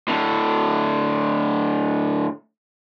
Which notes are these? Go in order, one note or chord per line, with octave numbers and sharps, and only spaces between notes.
A2 D3